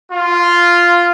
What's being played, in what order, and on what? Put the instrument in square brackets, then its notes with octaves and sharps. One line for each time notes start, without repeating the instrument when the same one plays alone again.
[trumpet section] F4